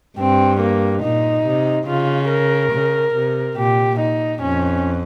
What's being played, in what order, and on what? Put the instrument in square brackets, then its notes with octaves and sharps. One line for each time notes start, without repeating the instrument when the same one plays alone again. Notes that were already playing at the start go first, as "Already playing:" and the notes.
[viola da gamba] G2 [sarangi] C4
[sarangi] A#3
[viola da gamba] A#2 [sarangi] D#4
[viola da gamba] C3
[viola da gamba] C#3 [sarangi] F4
[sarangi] A#4
[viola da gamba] C#3
C3
[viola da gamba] A#2 [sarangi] G4
[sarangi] D#4
[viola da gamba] F2 [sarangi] C#4